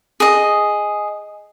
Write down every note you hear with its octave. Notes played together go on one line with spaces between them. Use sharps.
G#4 D#5